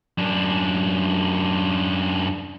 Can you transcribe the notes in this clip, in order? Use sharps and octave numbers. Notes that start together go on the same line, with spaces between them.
F#2 D4